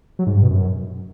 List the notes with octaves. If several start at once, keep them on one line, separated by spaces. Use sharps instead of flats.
F#3
G#2
G2
B2
F#2